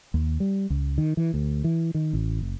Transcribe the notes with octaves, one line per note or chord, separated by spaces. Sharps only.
D#2
G3
C#2
D#3
E3
D2
E3
D#3
A1
F#1